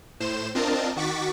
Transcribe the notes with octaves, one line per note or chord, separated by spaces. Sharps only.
A2 C5 E7
C4 D4 F4 A#4 D#5 A5
D#3 F#4 C#6 D6 A6 B6